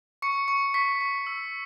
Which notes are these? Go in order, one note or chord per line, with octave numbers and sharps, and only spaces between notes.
C#6 C#7
C#6
C#6 B6
C#6
E6